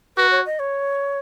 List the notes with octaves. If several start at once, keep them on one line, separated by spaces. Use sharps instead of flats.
F#4 B4
C#5
D#5
C#5